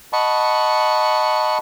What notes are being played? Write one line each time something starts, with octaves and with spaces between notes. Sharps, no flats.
D#5 F#5 A5 B5 C#6